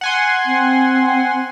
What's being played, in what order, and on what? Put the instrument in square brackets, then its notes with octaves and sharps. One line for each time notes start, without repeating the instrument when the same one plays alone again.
[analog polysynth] F#5 G#5 C6
[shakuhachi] C4